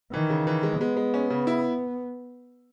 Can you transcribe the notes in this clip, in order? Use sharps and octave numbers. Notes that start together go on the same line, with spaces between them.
D#3 E3
C#3
E3
G#3
G#3 B3
G#3
C#4
C#3
E4